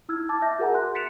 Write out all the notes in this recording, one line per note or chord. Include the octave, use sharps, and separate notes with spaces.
E4 E6 F6 G#6
A5 D6 A6
E5 G6 A#6
F#4 G#4 A#4 F#5 G#5 A#5
A#5 C6 F#6
A6 B6 C#7 D7 E7 F7